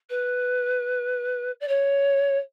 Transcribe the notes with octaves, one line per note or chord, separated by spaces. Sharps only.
B4
D5
C#5